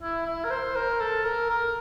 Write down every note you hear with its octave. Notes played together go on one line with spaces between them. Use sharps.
E4
E4
A#4
C5
A#4
A4
A#4
A#4